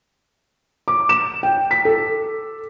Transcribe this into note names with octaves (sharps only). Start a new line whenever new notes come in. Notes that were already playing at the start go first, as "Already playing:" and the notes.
D6
E7
G5
B6
A4